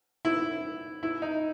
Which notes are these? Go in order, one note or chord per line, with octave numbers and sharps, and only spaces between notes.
E4
E4
D#4